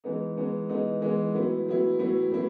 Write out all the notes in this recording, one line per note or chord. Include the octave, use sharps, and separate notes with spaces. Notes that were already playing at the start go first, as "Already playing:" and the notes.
E3 G#3 B3 D#4
E3 G#3 B3 D#4
E3 G#3 B3 D#4
E3 G#3 B3 D#4
A2 F#3 B3 E4
A2 F#3 B3 E4
A2 F#3 B3 E4
A2 F#3 B3 E4